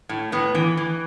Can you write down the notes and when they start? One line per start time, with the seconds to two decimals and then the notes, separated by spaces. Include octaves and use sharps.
0.09 A2
0.32 A2 B3
0.55 E3
0.77 E3